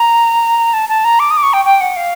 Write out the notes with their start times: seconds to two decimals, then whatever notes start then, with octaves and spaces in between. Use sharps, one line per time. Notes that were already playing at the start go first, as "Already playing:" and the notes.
Already playing: A#5
0.73 A5
0.89 A5
1.04 A#5
1.19 D6
1.31 D#6
1.37 D6
1.43 C#6
1.53 G5
1.65 G5
1.81 F#5
1.96 F5